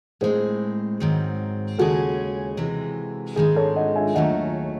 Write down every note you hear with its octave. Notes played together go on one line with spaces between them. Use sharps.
A2 G#3 C4 G#4 C5
G#2 D#3 F#3 C4
D#2 C#3 G#3 C#4 F#4 G#4 A4
C3 E3 G#3
G#2 D#3 G#3 C4 G#4
A4 C#5
D#5 F#5
E5 G#5
D#2 D#3 F#3 A3 D#5 F#5